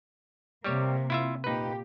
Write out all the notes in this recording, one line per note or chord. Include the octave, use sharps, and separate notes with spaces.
C3 G3 A#3 G4 C#5
E4 F4 E5
A#2 D#4 G4 B4